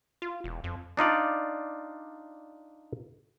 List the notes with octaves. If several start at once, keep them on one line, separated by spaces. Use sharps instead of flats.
F4
E1
F2
D4 D#4 F4 D5